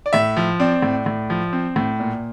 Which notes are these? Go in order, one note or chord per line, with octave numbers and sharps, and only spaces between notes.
D5
A2 E5
F3
C4 D5
A2
A2
F3
C4
A2
A#2